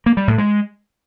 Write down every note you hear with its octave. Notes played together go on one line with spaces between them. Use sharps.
A#3
G3
A2
G#3